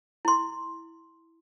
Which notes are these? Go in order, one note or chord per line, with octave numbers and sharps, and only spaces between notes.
E4 C6